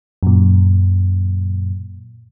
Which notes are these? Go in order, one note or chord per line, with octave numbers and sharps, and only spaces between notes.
F#2 A#2